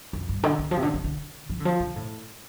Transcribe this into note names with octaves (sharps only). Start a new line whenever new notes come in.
F2
G2
D3
D3
F3
C3
D3
F3
D3
F3
D3
F3
D3
A2